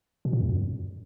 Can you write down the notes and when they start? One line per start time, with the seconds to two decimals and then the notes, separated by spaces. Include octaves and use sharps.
0.25 B2
0.33 A#2
0.41 E2
0.49 F#2